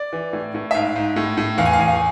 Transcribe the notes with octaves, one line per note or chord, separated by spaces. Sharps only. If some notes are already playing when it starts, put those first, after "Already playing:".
Already playing: D5
E3
A2
A2
E5
G#2 F5
G#2
A2
A2
E2 F5
G#5
F5
E2 G#5
F5
G#5